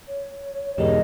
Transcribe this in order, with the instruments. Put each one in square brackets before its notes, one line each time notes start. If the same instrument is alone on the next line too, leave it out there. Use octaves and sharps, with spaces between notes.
[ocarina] C#5
[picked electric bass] E2 G#2 B2 [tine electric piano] G4 G#4 A#4 [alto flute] D#5